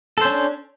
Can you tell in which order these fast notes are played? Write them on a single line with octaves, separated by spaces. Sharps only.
A4 C5 C#4 D4